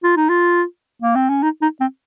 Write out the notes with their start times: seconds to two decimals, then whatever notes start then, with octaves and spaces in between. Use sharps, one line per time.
0.03 F4
0.16 D#4
0.29 F4
1.02 A#3
1.15 C4
1.29 C#4
1.43 D#4
1.62 D#4
1.80 C4